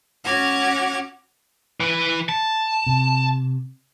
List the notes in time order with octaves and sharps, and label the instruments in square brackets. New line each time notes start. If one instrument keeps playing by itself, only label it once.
[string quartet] C#4 F#4 F#5 D6 F6 G#6
[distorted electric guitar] E3 B4
A5
[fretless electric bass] C3